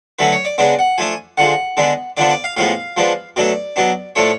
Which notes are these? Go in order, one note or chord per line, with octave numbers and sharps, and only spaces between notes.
D3 F#3 A3 C#4 B4
C#5
D5
C#3 G#3 B3 D4 D5
F#5
F3 A3 D4 G#5
D3 F3 G#3 F#5
D3 G#3 B3 D4
D3 F3 B3 D4 D5
D5
F5
A2 F3 G#3 B3 F5
F3 G#3 B3 D4
B2 F#3 A3 D4 D5
B2 F#3 B3 D4
A2 F3 A3 D4 C#5